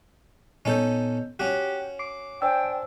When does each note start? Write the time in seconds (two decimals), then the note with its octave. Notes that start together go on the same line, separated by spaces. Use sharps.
0.65 A#2 B3 C#4 D#4 A4 G6
1.40 C#4 F#4 G4 F#6
1.99 D6 C7
2.42 D4 C5 G5 G#5 E6